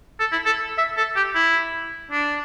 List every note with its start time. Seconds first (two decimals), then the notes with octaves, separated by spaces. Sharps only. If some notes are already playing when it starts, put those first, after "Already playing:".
0.20 A4
0.32 E4
0.46 A4
0.78 E5
0.97 A4
1.16 G4
1.35 E4
2.11 D4